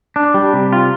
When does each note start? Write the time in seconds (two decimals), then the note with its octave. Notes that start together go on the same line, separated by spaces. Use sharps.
0.16 D4
0.34 G3
0.53 C3
0.73 F4